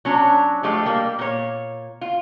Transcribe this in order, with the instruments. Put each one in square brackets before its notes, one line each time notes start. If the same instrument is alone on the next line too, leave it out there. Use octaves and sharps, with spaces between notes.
[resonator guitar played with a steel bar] F#3 C#4 D4
F3 G#3 A3 G4
G3 A#3
A#2 C#5
F4